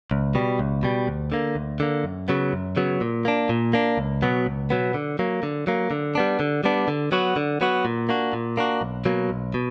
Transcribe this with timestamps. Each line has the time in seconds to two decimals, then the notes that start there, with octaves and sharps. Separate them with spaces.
0.11 C#2
0.35 B2 G3
0.59 C#2
0.83 B2 G3
1.08 D2
1.32 D3 A#3
1.55 D2
1.80 D3 A#3
2.04 F#2
2.28 C#3 F#3 B3
2.53 F#2
2.77 C#3 F#3 B3
3.01 A#2
3.25 A#3 D4
3.49 A#2
3.73 A#3 D4
3.98 C#2
4.22 B2 F#3 B3
4.46 C#2
4.70 B2 F#3 B3
4.94 D3
5.19 F#3 A#3
5.43 D3
5.67 F#3 A#3
5.91 D3
6.15 G3 B3 D4
6.40 D3
6.64 G3 B3 D4
6.88 D3
7.12 F#3 B3 F#4
7.36 D3
7.61 F#3 B3 F#4
7.85 A#2
8.09 A#3 D4 F#4
8.33 A#2
8.57 A#3 D4 F#4
8.81 B1
9.05 B2 F#3 A#3
9.29 B1
9.54 B2